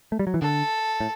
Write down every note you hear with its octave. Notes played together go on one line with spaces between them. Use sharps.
A3
G3
F#3
E3
D3 A4
A2